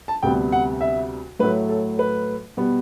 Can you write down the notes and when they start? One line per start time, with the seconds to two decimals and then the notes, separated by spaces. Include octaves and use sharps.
0.08 A5
0.23 D2 C3 G3 B3 G5
0.52 F#5
0.81 E5
1.39 A2 F#3 A3 B4
1.69 A4
1.99 B4
2.57 B2 G3 B3